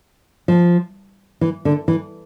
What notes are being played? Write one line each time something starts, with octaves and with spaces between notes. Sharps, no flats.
F3
E3
D3
E3